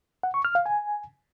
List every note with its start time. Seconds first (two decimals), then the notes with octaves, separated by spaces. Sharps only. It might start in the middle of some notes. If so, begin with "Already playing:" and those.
0.23 F#5
0.34 C#6
0.45 F6
0.55 F5
0.66 G#5